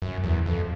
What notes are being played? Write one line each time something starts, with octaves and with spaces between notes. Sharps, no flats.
F#2
E2
F2